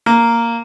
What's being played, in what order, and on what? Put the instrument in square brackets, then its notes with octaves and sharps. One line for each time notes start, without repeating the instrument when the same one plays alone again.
[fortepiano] A#3